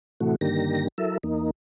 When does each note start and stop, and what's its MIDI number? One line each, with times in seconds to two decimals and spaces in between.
0.20 0.36 45
0.20 0.36 48
0.20 0.36 52
0.20 0.36 57
0.20 0.36 66
0.41 0.88 43
0.41 0.88 50
0.41 0.88 51
0.41 0.88 58
0.41 0.88 67
0.41 0.88 94
0.98 1.17 54
0.98 1.17 64
0.98 1.17 69
0.98 1.17 70
0.98 1.17 76
1.23 1.50 40
1.23 1.50 58
1.23 1.50 63